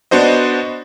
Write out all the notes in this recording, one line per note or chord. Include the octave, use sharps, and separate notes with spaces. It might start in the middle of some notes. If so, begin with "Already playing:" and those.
B3 D4 F#4 C5 D#5